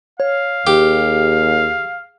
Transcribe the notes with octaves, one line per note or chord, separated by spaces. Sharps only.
C#5 F5
D#2 G4 G#4